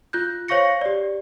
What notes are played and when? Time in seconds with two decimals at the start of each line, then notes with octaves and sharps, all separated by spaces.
0.13 F4 F#6 G6
0.48 C5 C#5 F5 C#6 A#6 C#7
0.81 G4 D5